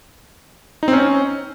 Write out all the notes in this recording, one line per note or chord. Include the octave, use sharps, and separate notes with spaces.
D#4
C4
C#4